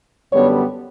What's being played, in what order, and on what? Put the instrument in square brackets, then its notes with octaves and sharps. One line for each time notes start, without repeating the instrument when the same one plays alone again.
[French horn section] F#2 D3 G3 B3 C#5